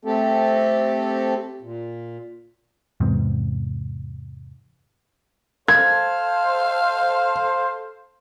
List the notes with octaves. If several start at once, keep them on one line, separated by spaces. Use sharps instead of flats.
A3 C4 G4 A4
A#2
E2 G#2 C3
A4 C5 F5 G#6